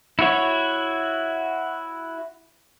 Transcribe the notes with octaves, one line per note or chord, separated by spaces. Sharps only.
E4 F#4 C#5